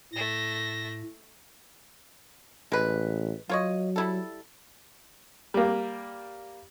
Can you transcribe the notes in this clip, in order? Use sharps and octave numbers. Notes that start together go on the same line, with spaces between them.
A2 A3 A#6
A1 G#3 B4
F#3 F4 C#5 D#5
G3 E4 A4
G3 A#3